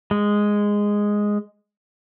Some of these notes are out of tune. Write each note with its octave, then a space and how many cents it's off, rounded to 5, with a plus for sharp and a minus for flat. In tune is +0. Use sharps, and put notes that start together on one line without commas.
G#3 -5